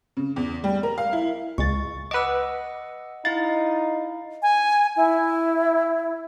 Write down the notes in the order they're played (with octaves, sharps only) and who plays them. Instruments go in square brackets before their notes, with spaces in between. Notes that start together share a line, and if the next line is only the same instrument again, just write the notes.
[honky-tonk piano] C#3
E2
G3
A#4
F5
E4
[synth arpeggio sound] C#2 G#3 A6 [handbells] C#6
[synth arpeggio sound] B4 D6 [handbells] D#5 F#5 E6
[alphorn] D#4 [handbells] E4 F5 [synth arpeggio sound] A6
[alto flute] G#5
E4